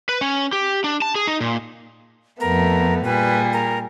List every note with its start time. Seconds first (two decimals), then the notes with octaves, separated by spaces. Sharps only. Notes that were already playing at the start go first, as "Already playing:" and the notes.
0.09 B4
0.21 C#4
0.53 G4
0.84 D4
1.02 A5
1.15 G#4
1.27 D#4
1.41 A#2
2.40 F2 A3 B3 A#4
3.04 A#2 G3 G#4 B4
3.53 A#4